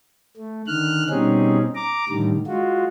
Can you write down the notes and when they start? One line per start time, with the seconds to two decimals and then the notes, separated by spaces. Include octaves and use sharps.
0.37 A3
0.67 D3 D#3 F6 F#6
1.10 B2 G3 C4 C#4 D#4 G#4
1.75 A#5 D6
2.09 A2 D3 D#3 G3
2.47 G#3 F4 F#4